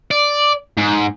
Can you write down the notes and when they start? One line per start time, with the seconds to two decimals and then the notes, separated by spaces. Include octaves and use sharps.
0.11 D5
0.77 G#2